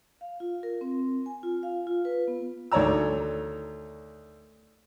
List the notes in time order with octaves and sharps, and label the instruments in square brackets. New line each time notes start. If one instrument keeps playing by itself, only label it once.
[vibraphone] F5
F4
A#4
C4
G#5
F4
F5
F4
B4
B3
[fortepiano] D2 D#3 C#5 D5 A#5 E6